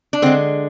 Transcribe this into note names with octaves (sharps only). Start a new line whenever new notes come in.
D4
D3 G#3 C4